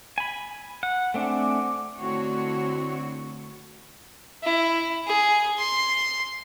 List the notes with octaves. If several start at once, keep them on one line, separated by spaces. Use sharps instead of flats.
G#5 B5
F#5
A3 C4 D4 F#5 G#5 D6
D3 A3 C4 E4 F#4 C#5
E4
G#4
C6